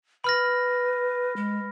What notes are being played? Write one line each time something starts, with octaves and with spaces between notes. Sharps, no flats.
B4 B5 F6 A#6
G#3